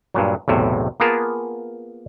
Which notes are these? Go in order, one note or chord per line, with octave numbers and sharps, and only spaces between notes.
G2 A#2 F#3
B1 E2 A2 C3
A#3 B3 F4 G#4 A#4 A5